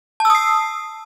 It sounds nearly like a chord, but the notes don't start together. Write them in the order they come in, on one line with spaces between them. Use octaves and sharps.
A5 E6 D#6 C7